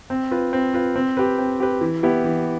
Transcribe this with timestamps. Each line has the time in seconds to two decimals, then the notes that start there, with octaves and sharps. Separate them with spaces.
0.10 C4
0.31 F4 B4
0.53 C4
0.74 F4 B4
0.96 C4
1.17 G4 B4
1.38 C4
1.60 G4 B4
1.81 E3
2.03 B3 E4 G4
2.24 E3